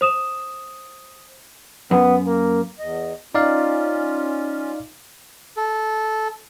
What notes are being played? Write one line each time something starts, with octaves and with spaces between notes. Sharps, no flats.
C5 D#6 E7
F#2 B3
A#3
E2 D#5
C#4 D#4 F4 D5 F5
A4